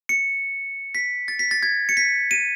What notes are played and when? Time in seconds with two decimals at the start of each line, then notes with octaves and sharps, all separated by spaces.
0.09 C#7
0.95 B6
1.28 A6
1.39 B6
1.51 A6
1.63 G#6
1.89 C#7
1.97 B6
2.31 D#7